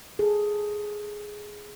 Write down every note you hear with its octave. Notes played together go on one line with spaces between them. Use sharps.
G#4 A4